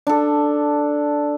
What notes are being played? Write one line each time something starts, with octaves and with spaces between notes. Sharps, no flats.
D4 A4